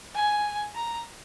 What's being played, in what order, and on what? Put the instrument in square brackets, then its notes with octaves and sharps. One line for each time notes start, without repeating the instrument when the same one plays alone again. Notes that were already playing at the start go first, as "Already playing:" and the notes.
[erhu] G#5
A#5